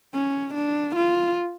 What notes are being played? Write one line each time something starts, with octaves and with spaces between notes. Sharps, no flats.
C#4
D4
F4